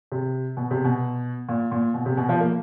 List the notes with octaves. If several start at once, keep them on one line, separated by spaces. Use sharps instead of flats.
C3
B2
C3
B2
A#2
A#2
B2
C3
B2
F3
A#3